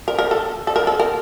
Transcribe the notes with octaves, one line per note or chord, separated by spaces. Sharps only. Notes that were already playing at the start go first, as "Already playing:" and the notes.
A#4
A#4
A4
A4
A#4
A4
A#4